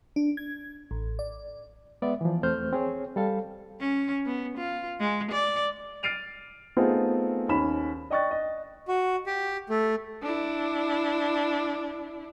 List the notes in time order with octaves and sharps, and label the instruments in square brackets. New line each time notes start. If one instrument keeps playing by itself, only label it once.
[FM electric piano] D4
G#6
A1
D5
[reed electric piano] G#3 B3 D5 E5
E3 F3
E2 A3 C4 C5 F6 G6
C4 G#4 C#5
G3 A4 F5
[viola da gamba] C#4
B3
F4
G#3
D5
[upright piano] F6 A6 C7 D7 D#7 F7
A3 B3 C4 D#4 F4 G#4
D#2 C#4 B5 E7
D5 D#5 G5 C#6 F#6 A6
D#5
[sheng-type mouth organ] F#4
G4
A3
[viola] D4 E4